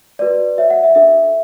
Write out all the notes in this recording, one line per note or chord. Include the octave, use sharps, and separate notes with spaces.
F#4 B4 D5
F#4 C#5 E5
F#5
E5
D4 F#4 A4 E5